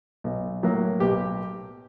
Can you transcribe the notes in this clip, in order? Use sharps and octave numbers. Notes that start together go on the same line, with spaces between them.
B1
A2 F#3 A#3
B1 G4